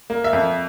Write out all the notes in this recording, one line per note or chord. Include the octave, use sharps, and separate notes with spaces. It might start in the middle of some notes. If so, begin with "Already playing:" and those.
A#3
E5
F2